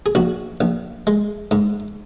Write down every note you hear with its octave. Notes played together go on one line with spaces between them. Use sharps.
G#4
A#1 F#4
A#1
G#3
G#2